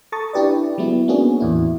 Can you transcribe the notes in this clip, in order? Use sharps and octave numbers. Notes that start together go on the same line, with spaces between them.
A4 A5 A#5 C#6 D#6 A6
D4 E4 G4 B4 D5
F#3 G#3 B3 E4
A#3 B3 C#4 D4 F#4 G#4
E2 A2 E4